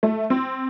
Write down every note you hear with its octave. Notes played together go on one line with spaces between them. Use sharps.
A3
C4